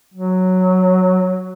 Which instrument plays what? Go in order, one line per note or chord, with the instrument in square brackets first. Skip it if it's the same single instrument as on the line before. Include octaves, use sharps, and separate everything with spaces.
[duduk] F#3